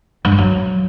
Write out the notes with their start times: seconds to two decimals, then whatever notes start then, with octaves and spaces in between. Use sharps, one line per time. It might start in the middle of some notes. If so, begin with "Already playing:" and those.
0.25 G2
0.32 G#3
0.38 F#3